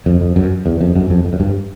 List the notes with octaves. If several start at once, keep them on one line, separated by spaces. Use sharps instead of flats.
F2
F2
F#2
E2
F2
F#2
F2
F2
F#2
G2